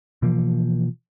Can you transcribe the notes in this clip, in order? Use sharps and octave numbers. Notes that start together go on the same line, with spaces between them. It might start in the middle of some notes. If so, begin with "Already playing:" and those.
B2 E3 F3 A#3